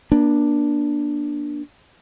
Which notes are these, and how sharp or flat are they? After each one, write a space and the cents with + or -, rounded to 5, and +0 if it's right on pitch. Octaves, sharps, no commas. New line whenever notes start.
A#3 +40 D4 +0